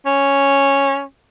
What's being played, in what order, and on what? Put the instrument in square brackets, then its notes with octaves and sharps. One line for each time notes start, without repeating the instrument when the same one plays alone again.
[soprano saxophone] C#4